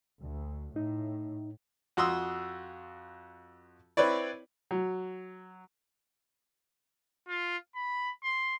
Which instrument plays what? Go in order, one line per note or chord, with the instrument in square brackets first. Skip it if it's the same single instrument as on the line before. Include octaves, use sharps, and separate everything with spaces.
[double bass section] D2
[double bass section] A2 [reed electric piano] D#4
[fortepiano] F2 F#4 C6 D#6 E6
C4 E4 B4 C#5 D5
F#3
[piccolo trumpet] F4
B5
C6